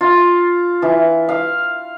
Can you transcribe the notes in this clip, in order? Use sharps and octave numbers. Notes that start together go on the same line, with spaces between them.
F4
E3
F5